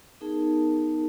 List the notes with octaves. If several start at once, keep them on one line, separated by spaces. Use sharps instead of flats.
B3 D#4 G#4 A#4 A5